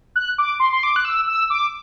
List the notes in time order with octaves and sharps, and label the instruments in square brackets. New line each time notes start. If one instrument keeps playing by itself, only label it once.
[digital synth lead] F#6
D6
C6
C6
D6
F#6
E6
E6
D6